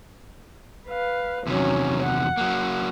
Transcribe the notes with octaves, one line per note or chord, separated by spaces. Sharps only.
B4 F5
E2 C3 D#3 F#3 C#4
F#5
F#3 A#3